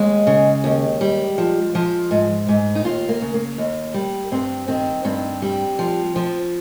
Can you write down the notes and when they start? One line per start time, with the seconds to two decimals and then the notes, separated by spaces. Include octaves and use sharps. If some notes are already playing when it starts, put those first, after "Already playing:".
Already playing: D#2 G#3
0.27 C#3
0.64 D#2
1.01 G3
1.38 F3
1.75 F3
2.11 G#2
2.48 G#2
2.75 D#4
2.84 D#2 F4
3.09 A#3
3.21 C#3
3.34 A#3
3.58 D#2
3.94 G3
4.32 G2 C4
4.68 D#3 C4
5.04 G2 C4
5.42 G3
5.79 F3
6.16 F3